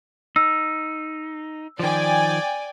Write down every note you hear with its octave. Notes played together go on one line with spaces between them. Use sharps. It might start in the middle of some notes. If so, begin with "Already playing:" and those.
D#4 E6
D#3 F3 D5 G5 G#5